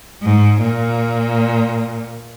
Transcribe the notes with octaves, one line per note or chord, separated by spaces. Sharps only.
G#2
A#2